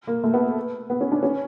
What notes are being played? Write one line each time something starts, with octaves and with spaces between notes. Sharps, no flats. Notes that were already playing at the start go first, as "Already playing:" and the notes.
A#3
A3
B3
B3
C#4
D4
C#4